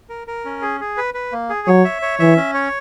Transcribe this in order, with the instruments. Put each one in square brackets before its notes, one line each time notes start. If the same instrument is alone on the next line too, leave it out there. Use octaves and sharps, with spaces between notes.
[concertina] A#4
A#4
C#4
G#4
G#4
B4
B4
A#3
G#4
[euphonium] F#3 [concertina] C#5
[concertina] E5
C#5
[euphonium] E3 [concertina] E5
[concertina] C#4
C#5